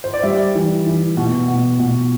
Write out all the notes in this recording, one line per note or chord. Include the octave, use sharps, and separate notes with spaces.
C5
D5
G3 E5
E3
E3
B2
B2
B2